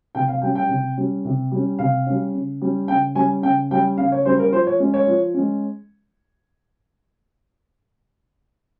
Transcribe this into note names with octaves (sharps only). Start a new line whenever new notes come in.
C3 G5
F5
G3 C#4 G5
G5
C3
G3 C#4
C3
G3 C#4
C3 F5
G3 C#4
C#3
G3 C#4
C#3 G5
G3 C#4 G#5
C#3 G5
G3 C#4 G5
C#3 F5
C#5
G3 C#4 C5
A#4
F3 C5
C#5
G#3 C#4
C#5
F3
G#3 C#4